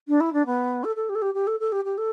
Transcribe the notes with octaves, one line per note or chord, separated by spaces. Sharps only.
D4
E4
D4
B3
A4
A4
G4
A4
G4
G4
A4
A4
G4
G4
A4